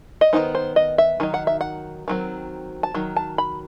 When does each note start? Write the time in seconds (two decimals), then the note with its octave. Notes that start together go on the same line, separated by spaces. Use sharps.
0.21 D#5
0.33 D#3 F#3 B3 D#4 C5
0.55 C5
0.76 D#5
0.98 E5
1.20 D#3 F#3 D#4
1.34 F#5
1.47 E5
1.61 F#5
2.08 D#3 F#3 C4
2.83 A5
2.95 D#3 F#3
3.16 A5
3.38 B5